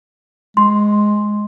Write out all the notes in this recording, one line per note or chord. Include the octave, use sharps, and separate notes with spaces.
G#3 C6